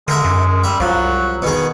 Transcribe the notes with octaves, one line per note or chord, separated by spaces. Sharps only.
D3 G#3 A#4 E5
F#2
G3 E5
C2 F3 F#3
B2 D#3 G#4